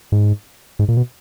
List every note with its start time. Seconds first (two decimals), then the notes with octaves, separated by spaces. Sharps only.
0.12 G#2
0.79 G#2
0.88 A#2
0.97 B2